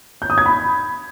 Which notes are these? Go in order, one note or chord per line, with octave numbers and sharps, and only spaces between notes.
G6
D#6
G#6
B5